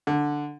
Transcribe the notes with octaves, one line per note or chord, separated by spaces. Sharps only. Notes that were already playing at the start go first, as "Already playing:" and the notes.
D3